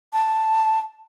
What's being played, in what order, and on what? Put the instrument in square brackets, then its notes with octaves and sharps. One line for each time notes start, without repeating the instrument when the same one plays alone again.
[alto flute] A5